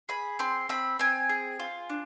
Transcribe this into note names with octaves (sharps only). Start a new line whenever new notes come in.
G#4 B5
C4 C6
C4 B5
C4 G#5
G#4
F4
D4